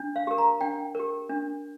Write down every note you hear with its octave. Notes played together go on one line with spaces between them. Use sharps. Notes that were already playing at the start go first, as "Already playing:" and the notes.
Already playing: D4
F5
G4 A#4
A#5
D4 G5
G4 A#4
D4